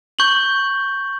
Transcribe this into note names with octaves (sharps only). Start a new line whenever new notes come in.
C#6 G6 F#7